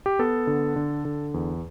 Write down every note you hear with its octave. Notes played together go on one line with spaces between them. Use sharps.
G4
B3 A4
D3
D3
D3
E2